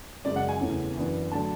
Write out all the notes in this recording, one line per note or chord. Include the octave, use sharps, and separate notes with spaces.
F#2 C#3 G#3 D5
F#5
G#5
E2 C#3 E3 A3 C#4
F#2 E3 B3 D4
D3 F#3 A3 D4 A5